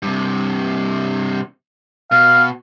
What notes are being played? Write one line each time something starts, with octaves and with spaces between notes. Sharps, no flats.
G2 C3
B2 F5